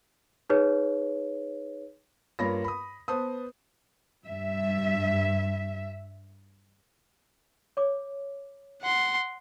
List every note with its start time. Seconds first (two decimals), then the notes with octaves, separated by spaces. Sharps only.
0.50 D#4 G#4 B4 C#5
2.39 G2 A#3 F4 C#5 B5 A#6
2.64 B5 D#6
3.08 B3 B4 C5 A5 D#6
4.26 G2 E5
7.77 C#5 D6
8.82 F#5 C6